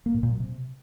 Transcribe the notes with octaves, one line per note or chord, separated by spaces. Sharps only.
A#3
A2
A#2
F#3
C3